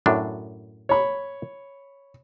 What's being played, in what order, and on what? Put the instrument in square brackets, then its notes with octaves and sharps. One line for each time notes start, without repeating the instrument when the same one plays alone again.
[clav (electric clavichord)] F#2 A2 D4
[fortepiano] C#5 B5